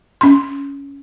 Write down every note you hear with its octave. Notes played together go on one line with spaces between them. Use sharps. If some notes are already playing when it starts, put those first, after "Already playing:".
C#4 C6